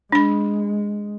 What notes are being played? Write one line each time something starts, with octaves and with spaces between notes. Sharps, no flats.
G#3 D4 B5